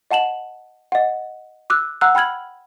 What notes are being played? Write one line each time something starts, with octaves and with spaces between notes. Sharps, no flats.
D#5 F#5 A5 E7 F#7
D#5 F#5
D6 E6 F#6
F#5 A#5 E6 F#6
G5 B5 F6 G#6 F#7